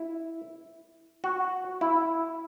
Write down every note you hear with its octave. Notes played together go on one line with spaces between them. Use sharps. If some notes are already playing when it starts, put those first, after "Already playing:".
Already playing: E4
F#4
E4